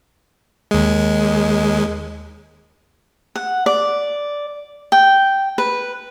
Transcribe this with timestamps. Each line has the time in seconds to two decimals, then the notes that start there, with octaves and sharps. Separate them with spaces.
0.71 D#2 G#3
3.36 F#5
3.66 D5
4.92 G5
5.58 B4